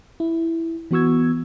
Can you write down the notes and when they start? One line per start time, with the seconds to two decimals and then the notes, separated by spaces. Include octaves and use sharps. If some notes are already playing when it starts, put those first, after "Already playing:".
0.20 E4
0.91 E3 B3 F#4 C#6 E6 G#6